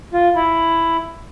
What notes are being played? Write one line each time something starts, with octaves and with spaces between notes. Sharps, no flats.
F4
E4